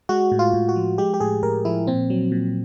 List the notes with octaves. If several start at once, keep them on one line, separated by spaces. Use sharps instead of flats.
G#3 F#4
A2
F4
A2
F#4
F3
G#3 G4
G4
A2 G#4
A2 A#4
F3 E4
A#2 C4
F#3
A#2